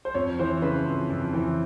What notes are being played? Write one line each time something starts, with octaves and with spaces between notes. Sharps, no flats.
C5
F2 C#5
E3 C5
C#3 B4
F2
F2
E3